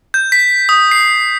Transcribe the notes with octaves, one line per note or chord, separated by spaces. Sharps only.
G6
B6
D#6
C7